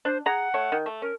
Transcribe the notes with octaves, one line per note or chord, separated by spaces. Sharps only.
D4 C5
G#4 F#5 A#5
A3 C#5
D#3
A3
C#4 A#4